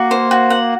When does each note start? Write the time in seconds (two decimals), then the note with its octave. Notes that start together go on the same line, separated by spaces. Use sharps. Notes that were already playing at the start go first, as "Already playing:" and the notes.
Already playing: A#3 F#4
0.11 C5
0.31 F#4
0.50 F#5